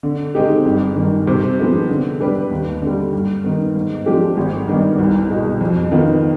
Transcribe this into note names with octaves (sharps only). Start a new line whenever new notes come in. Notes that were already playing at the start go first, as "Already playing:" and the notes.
D3
G#3 C4 D#4 G4
G1
G2 D#3
C3
F3 G#3 B3 D#4
D3
G3 D4 G4 B4
D#2
D3 G3
G2
D#3 B3
G#2
F3 G#3 D4 G4
G#1
G2 D#3 B3 D4
C2
B2 G#3
F2
D#3 B3 F4